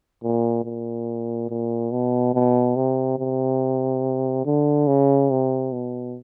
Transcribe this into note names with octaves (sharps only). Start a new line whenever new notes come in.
A#2
A#2
A#2
B2
B2
C3
C3
D3
C#3
C3
B2